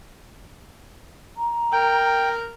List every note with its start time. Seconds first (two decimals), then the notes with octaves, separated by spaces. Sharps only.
1.37 A#5
1.72 A#4 G5